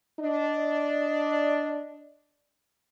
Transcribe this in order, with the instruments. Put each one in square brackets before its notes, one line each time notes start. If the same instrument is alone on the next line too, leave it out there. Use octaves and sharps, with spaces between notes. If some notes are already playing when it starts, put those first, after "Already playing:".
[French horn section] D4 D5 D#5